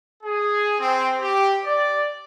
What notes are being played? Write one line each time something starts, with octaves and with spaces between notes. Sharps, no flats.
G#4
C4
G4
D5